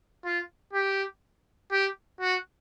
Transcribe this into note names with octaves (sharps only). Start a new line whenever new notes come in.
F4
G4
G4
F#4